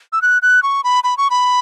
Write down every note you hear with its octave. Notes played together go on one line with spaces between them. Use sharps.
E6
F#6
F#6
C#6
B5
B5
C#6
B5